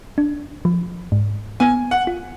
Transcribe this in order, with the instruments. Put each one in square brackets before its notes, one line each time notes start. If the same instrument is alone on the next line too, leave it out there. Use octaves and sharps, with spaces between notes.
[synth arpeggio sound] D4
F3
G#2
[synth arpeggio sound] B3 [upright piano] G#5
[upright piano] F#5
[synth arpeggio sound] F4